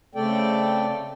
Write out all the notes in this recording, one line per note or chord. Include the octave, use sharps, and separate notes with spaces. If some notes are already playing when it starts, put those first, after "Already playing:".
C#3 A3 C4 A4 D5 G5